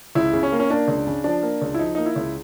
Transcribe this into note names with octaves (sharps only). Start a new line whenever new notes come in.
C#2 E4
C#3
C#4
A#3
C#4
A#3 D4
C#2
C#3
F3 D4
A#3
C#2
E4
F3 D#4
A#3 D#4
E4
C#2